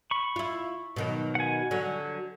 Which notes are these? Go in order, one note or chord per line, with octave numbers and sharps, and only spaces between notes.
B5 C#6
E4 F4
B2 D#3 F#3
F#5 G#5
D3 F#3